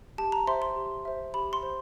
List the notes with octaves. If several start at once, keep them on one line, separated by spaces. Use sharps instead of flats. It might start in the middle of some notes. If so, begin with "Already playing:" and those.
G4 A5
A#5
C5 E5 C6
C6
G4
C5 E5
G4 B5
C6
C5